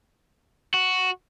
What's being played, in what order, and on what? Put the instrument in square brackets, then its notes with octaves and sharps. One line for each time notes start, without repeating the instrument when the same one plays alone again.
[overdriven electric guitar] F#4